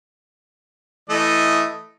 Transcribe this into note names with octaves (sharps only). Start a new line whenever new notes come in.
E3 A3 D#5